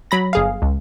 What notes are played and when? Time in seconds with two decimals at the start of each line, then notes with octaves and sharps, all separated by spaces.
0.11 F#3 B5 A#6
0.33 G1 G#4 F5
0.62 C#2